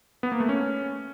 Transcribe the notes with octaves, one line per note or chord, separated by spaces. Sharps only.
B3
A#3
A3
C#4